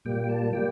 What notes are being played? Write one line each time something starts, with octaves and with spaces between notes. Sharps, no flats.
A#2 G3 A#3 G5
G5
A5
G3 A#3 G5